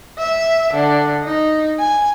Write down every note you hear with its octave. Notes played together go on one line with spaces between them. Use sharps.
E5
D3
D#4
G#5